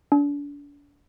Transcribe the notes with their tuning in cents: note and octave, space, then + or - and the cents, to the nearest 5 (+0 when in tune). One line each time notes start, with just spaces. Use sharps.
D4 -35